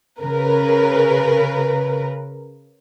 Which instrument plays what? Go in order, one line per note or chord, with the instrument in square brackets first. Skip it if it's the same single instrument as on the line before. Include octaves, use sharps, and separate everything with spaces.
[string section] C#3 A#4 B4